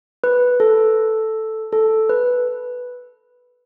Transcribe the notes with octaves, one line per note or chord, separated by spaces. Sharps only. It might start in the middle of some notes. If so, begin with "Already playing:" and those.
B4
A4
A4
B4